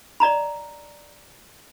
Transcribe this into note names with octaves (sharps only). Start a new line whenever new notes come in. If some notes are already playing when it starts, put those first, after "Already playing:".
D5 D#5 A#5 B5